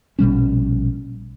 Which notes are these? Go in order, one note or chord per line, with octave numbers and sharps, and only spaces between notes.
A#1 B2 G3 C#4